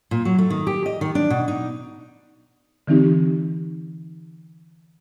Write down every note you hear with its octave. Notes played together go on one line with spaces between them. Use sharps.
A#2
F#3
A3
D#3
G4
D#5
D#3
D4
B2
D#4
D3 E3 C4 D#4 G4